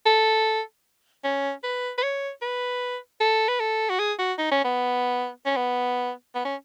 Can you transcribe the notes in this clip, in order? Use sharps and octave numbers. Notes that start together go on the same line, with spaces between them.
A4
C#4
B4
B4
C#5
B4
A4
B4
A4
F#4
G#4
F#4
D#4
C#4
B3
C#4
B3
B3
C#4